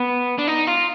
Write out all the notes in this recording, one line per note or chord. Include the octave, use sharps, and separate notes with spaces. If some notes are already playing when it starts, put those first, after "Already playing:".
Already playing: B3
D4
D#4
F4